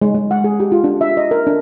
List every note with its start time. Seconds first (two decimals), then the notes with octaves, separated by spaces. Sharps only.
0.02 G#3
0.14 G#3
0.31 F#5
0.44 G#4
0.60 G4
0.72 F4
0.84 D4
1.01 E5
1.17 D#5
1.31 A#4
1.47 D4